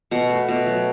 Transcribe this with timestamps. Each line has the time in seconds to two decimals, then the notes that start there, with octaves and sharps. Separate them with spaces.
0.11 B2 F#5
0.30 A3
0.48 B2
0.67 F#3